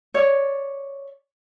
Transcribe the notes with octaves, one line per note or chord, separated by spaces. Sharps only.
C#5 D5